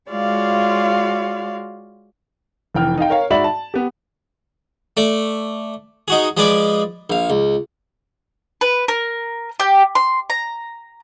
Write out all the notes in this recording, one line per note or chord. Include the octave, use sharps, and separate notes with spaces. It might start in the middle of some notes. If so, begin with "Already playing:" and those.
G#3 F4 F#4 C#5 D5 F5
F1 E3 G5 F6
D#4 D#5 F5 G5
A#4 C#5 F5
G#2 F#4 D5 E5 B5 F#7
A5
B3 G4
A3 D5
D#4 F#4 G#4
F3 G#3 G#4 B4 D5 D6
A#1 F5
C#2
B4
A#4
G4
C6
A#5